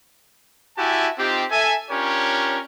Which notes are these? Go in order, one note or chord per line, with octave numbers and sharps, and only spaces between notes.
E4 F#4 G4 E5 G#5 A5
C4 D#4 F4 G4
A4 E5 G#5
C#4 D4 F4 G4 A#4 C#5